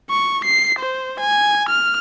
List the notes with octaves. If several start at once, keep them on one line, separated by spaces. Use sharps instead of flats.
C#6
C7
C5
G#5
F6